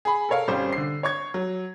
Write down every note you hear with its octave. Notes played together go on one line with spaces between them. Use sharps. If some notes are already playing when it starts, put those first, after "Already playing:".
G#4 B5
A4 A#4 C#5 F5
G#1 G3 C#4 C5
D3 C7
C#5 C#6 G#6
F#3